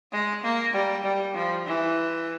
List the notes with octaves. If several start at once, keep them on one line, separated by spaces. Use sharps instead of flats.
G#3
A#3
G3
G3
F3
E3